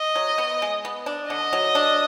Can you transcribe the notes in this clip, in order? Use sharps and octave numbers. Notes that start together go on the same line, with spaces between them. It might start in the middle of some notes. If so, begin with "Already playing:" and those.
Already playing: D#5
F#3
B3
G#3
B3
D4
D3 D#5
F#3
D4